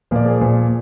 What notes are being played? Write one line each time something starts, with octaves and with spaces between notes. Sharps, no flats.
A#2 F3 A#3 D5
G#4 C5
A#2 F3 A#3